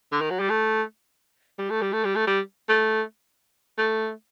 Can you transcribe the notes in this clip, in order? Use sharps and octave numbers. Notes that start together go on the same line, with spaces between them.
D3
D#3
F#3
G3
A3
G3
A3
G3
A3
G3
A3
G3
A3
A3